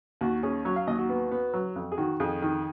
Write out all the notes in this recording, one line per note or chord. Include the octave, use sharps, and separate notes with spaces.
D#2 F#4
C#4 G#4
F#3 C#5
F5
D#2 D#5
F#4
B3
B3
F#3
F2
G#4
D#3 F#4
F2 G#4
D#3